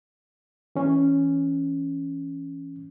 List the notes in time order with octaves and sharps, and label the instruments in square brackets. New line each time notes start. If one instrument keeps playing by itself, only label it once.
[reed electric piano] E3 C#4